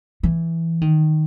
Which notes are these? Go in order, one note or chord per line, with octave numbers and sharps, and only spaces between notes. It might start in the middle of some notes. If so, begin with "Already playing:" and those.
E3
D#3